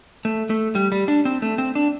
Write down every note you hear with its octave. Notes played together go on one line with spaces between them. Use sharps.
A3
A3
G3
G3
D4
C4
A3
C4
D4